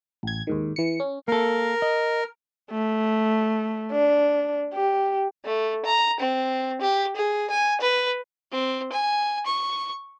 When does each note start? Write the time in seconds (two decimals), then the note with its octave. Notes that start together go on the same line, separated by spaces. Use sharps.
0.23 A1 G#6
0.47 D#2 G#2 D#3
0.76 E3 C#7
1.00 C#4
1.28 A#3 A4 A#4
1.82 D#5
2.71 A3
3.92 D4
4.74 G4
5.45 A3
5.85 A#5
6.20 C4
6.81 G4
7.16 G#4
7.50 G#5
7.81 B4
8.51 C4
8.92 G#5
9.46 C#6